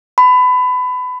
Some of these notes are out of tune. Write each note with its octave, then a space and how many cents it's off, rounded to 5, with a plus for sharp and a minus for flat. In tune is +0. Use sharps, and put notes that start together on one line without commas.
B5 +25